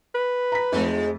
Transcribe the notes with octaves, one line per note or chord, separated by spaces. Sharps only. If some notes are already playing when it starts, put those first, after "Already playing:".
B4
A#5 B6
F2 F3 G#3 A3 D#4